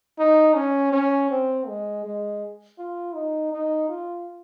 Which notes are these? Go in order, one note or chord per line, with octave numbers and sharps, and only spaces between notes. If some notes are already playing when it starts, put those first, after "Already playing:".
D#4
C#4
C#4
C4
G#3
G#3
F4
D#4
D#4
F4